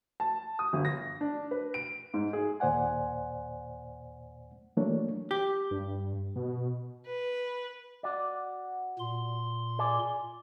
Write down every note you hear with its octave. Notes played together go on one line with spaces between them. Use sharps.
A5
D#6
G1
A#6
D4
B4
D7
G#2
G#4
D#2 A#2 C5 D5 F#5 G#5
E3 F#3 A3 A#3 D4 C#5
G4
G2
B2
B4
F#4 D5
A#2 C6
G#4 D5